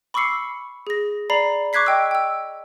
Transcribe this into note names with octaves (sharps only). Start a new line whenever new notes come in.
B5 C#6 D6 E6 C7 C#7
G#4 A#6
D5 A#5 B5 C7
C#6 D6 F#6 G#6 B6 C7
D#5 G5 E6
G5 E6